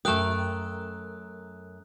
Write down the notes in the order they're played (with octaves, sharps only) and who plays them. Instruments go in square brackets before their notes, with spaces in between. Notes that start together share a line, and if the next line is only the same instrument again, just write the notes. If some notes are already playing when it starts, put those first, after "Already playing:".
[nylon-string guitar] F#2 A#4 [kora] A3 F5 G5 [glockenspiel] D#6 F#6